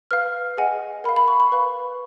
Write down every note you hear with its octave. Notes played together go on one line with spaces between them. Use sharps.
B4 F5 F6
G#4 D#5 F#5 G#5
A#4 F5 B5
B5
C#6
B5
B4 F5